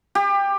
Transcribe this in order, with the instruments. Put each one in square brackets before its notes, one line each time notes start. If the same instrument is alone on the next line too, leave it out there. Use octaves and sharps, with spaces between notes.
[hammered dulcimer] G4